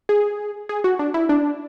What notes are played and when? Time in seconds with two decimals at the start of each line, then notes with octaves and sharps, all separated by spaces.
0.09 G#4
0.69 G#4
0.84 F#4
0.99 D4
1.14 E4
1.29 D4